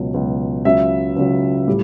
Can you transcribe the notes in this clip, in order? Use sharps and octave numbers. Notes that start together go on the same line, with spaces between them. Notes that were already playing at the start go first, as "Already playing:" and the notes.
Already playing: C#2 B2 F#3
C#2 B2 F#3
C#2 C#3 F#3 E5
C#2 C#3 F#3
A2 G3